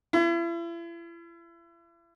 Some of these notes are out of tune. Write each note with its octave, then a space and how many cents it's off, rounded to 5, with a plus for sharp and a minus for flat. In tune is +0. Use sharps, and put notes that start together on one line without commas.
E4 +40